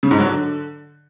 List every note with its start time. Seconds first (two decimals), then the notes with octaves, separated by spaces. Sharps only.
0.03 C#3
0.11 G#2
0.19 F#3
0.27 D3